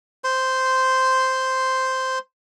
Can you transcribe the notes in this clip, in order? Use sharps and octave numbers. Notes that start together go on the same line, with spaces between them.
C5 C6